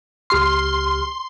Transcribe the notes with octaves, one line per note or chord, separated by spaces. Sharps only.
C#2 G4 C6 F6